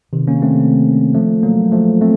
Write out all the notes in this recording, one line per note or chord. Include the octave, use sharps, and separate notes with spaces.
C3 D#3
A#3 C#4
A3 C4
F3 A3
F#3 A#3
F3 A3
A3 C4